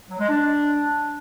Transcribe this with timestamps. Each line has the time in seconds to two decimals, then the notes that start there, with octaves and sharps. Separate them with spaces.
0.10 F#3
0.19 G#3
0.28 D4